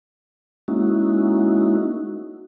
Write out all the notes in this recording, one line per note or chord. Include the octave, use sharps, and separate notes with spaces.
G#3 A#3 C#4 D#4 E4 F#4